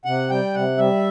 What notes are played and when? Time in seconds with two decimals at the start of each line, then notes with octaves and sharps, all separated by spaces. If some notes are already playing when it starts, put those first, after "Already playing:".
0.05 C3 F#5
0.30 G3 G5
0.54 C3 F#5
0.78 G3 E5